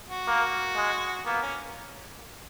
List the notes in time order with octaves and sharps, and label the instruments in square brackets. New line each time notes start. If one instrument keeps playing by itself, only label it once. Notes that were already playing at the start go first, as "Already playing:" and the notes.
[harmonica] F#4
[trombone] A#3
G#3
[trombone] A#3 [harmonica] B3
[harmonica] C#4